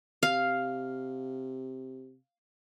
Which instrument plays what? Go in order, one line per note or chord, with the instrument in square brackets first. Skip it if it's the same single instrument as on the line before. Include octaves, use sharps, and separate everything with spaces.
[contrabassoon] C3 [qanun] F5